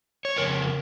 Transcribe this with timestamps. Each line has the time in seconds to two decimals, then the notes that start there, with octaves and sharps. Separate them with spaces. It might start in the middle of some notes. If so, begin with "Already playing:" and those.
0.25 C#5
0.36 F2 C#3 A#4